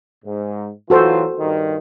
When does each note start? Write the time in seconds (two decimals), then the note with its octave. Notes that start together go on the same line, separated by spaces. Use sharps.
0.24 G#2
0.90 E3 F#3 F4 F#4 A4 C5
1.39 G2 D#3